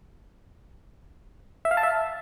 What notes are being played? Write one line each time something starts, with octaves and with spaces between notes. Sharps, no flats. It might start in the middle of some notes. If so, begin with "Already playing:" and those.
E5
F5
A5
E5